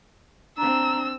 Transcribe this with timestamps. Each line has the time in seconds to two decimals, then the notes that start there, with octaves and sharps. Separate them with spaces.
0.58 C4 D4 A#5 E6